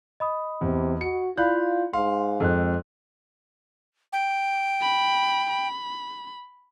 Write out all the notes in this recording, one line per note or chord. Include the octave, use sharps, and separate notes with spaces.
D#5 B5 D#6
E2 C3
F#4 C#7
E4 F4 D5 F5 B5 F#6 G6
G#2 F5 C6
F2 G#3 C4 A4 F#6
G5
B5
B5